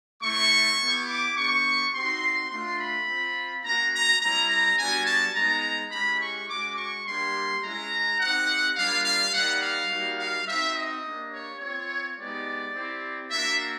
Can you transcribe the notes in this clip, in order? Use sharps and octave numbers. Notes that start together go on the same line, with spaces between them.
A3 C4 E4 C#6
B3 E4 G4
D6
B3 D4 G4 C#6
C4 D#4 F#4 C6
A3 D4 F4 C6
B5
C4 F4
A#3 C#4 F#4 A#5
A#5
G3 C4 E4 A#5
A#5
G3 B3 D4 F#4 G#5
A5
G#3 B3 D#4 A#5
G#3 C#4 E4 G4 B5
C#6
G#3 C#4 F#4 D6
C#6
G3 A#3 D4 G4 C6
G#3 C#4 E4 A#5
C4 D#4 G4 F#5
G3 A#3 D4 F4 F5
F5
G3 A#3 D#4 F#5
F5
G3 A#3 D#4 F#4
F5
C4 D#4 F#4 E5
D#5
A#3 D4 G4
C#5
C4 F4 C#5
G#3 B3 D#4 G4 D5
C4 E4 G4
A#3 D4 F#4 E5